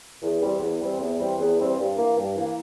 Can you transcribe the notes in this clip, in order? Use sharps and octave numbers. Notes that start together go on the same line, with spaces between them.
E2
E3 G3 C4
E2
E3 G3 C4
E2
E3 G3 C4
E2
E3 G3 C4
G2
E3 A#3
G2
E3 A#3